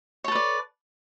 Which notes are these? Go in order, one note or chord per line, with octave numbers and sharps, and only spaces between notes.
A4 B4 C#5 D5